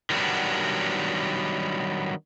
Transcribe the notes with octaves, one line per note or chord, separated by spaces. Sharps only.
D#3 F#3 G3 B3 D4